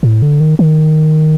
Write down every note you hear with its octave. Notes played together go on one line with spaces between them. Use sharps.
A2
D3
D#3
D#3